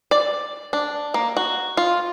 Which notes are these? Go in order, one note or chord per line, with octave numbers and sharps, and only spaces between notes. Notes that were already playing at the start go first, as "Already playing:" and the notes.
D5
D4
A#3
F#4
F4